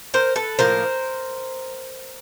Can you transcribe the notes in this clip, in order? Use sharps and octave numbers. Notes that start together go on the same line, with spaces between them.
A#4 C5
A4 B4
A2 F3 A#3 A#4 C5